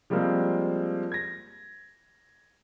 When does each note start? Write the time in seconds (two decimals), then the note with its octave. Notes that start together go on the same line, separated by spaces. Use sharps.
0.10 F3 G3 G#3 A#3 C4
1.12 G#6 A#6